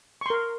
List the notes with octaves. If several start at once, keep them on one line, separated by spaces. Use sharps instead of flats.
A#4 C6 C#6